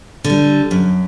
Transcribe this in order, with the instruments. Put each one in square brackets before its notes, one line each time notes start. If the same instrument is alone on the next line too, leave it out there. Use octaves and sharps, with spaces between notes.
[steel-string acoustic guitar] D3
G3
F#2